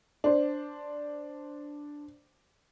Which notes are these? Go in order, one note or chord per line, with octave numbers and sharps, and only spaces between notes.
D4 C5